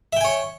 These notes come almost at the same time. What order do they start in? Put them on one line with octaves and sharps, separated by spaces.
E5 G5 G#5 C#5